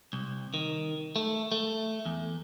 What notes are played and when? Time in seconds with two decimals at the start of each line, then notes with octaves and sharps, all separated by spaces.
0.13 C2
0.54 D#3
1.16 A3
1.52 A3
2.06 E2